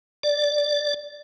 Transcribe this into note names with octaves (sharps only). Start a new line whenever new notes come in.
D5